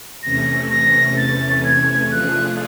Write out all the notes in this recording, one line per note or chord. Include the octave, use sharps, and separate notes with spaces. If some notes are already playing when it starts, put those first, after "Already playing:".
E2 C3 E3 A3 C#4 A#6
A#6
A6
G#6
F3 A3 D4 F4 G#4 F#6